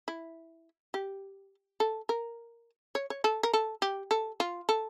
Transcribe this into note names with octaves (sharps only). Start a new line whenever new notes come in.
E4
G4
A4
A#4
C#5
C#5
A4
A#4
A4
G4
A4
F4
A4